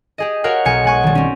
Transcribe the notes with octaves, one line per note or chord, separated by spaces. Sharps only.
G4 G#4 D#5
F#4 G4 A#4 C#5 F5 F#5
B1 G#5 C#7
G#3 F#5 G#5 C#6
D#3 G3
C4 C#4